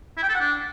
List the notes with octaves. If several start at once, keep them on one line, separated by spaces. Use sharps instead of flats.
E4
G5
A4
F#5
D4